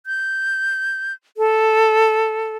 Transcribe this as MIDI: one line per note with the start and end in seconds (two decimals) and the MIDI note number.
0.06 1.13 91
1.37 2.57 69